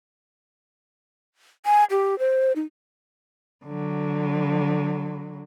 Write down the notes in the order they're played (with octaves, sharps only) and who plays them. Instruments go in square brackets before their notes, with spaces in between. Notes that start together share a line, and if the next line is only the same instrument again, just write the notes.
[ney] G#5
G4
C5
D#4
[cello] D3 F#3